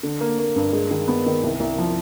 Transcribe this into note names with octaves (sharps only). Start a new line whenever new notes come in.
D3
A#3
A#3
G2
G#3
D#3
B3
D#3
C2
C2
F3